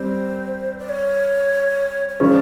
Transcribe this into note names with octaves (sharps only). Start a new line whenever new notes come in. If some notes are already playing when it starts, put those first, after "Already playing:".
Already playing: G3 C4 C5
D5
C#5
C#5
C#3 F3 G#3 C#4 D5